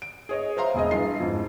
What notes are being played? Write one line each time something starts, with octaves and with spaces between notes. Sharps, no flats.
D7
G#4 C#5 D#5
C5 E5 F5 A#5 C6
E1 G#4 D#5
G2 E3 F3 F4 C7
F2 G#2